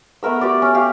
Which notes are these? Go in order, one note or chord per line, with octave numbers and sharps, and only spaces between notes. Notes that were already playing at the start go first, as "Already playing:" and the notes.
A3 B3 A#4 E6
F#4 G4 D5
C#4
G4 F5